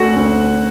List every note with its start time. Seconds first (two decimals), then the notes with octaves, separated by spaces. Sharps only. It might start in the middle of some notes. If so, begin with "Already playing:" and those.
Already playing: D2 A3 F#4 F#5
0.16 D2